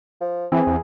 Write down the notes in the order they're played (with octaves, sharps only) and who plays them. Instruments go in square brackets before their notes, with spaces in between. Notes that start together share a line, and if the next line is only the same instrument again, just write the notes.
[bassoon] F3
[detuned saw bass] E3 [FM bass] C4 [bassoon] G#4
[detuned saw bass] E2